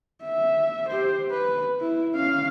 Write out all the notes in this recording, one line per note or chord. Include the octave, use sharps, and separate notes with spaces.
E5
G4 C5
B4
E4
C#4 F5